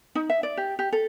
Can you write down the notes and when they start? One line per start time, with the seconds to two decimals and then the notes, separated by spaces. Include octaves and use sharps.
0.15 D#4
0.30 E5
0.43 D5
0.57 G4
0.79 G4
0.93 A4